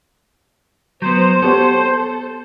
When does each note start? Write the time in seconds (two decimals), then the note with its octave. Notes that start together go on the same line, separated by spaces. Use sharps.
1.02 F#3 B3 C5
1.42 B3 G4 A4 C#5